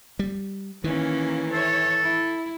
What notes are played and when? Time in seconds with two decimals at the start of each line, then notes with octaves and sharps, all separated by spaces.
0.19 G3
0.84 D#3 E3 A#3 C#4
1.52 A4 C#5 E5
2.02 E4